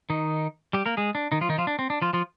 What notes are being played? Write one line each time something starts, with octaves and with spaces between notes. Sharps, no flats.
D#3 D#4
G3 G4
A#3 A#4
G#3 G#4
D4
D#3 D#4
F3 F4
D#3 D#4
F3 F4
D4
C4
D4
F3 F4
F3 F4